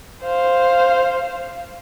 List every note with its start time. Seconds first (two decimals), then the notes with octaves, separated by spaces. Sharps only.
0.24 C5 F5